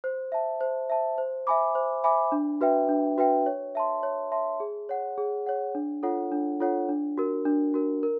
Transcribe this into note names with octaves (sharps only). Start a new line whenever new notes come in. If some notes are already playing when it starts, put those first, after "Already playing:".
C5
E5 A5
C5
E5 A5
C5
E5 G#5 B5 D6
C5
E5 G#5 B5 D6
D4
F#4 B4 E5 G5
D4
F#4 B4 E5 G5
C#5
E5 A5 C6
C#5
E5 A5 C6
G#4
C#5 F#5
G#4
C#5 F#5
D4
F4 A4 C#5 F#5
D4
F4 A4 C#5 F#5
D4
F#4 A#4
D4
F#4 A#4
A#4